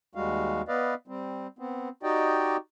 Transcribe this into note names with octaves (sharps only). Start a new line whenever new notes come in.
D#2 G3 G#3 F#4 F5
B3 B4 D5 D#5 F5
G3 C4
B3 C4
D#4 F#4 G4 D5 D#5 G5